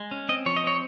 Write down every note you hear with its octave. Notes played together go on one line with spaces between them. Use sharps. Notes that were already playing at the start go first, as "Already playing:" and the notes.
Already playing: G#3
C#4
C4 D#5
F3 C#5
D#5
C4 C#5